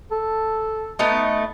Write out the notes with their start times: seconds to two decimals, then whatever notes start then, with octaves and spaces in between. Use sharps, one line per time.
0.12 A4
0.99 A3 B3 D#4